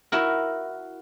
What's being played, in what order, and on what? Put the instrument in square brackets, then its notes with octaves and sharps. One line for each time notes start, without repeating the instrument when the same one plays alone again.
[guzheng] E4 F#4 A#4